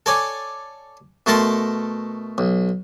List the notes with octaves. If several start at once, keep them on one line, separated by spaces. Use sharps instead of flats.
A4 C#5 D5 G#5
B2 A3 A4 A#4 A5 C6
B1